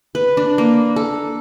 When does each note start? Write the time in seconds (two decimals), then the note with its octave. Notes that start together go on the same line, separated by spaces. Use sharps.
0.15 B4
0.37 D4
0.58 A#3
0.96 A4